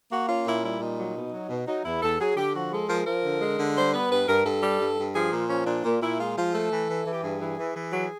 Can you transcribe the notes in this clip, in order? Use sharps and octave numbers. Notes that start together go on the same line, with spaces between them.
A#3 F#4
C#4 F4
A#2 E4
G3 E4
A#2 D#4
F#3
B2
F#3
B2
F#3 D#4
E2 E4
E2 A4
F#3 G#4
D3 G4
F3 F#4
G#3 A4
F3 A#4
F3 A#4
D3
G#3
D3
G3 C5
B3 B4
G2 B4
G2 A#4
G2 A4
G3
G2
G2
F3 G#4
A#2
F3 C#4
A#2 D4
A#2
A#2 E4
G#3 F4
F3 F4
A3 A4
E3
E3
E3
G4
G2 G#4
E3
E3
E3
F#3